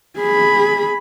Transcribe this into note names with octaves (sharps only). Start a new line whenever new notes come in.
G#4 B5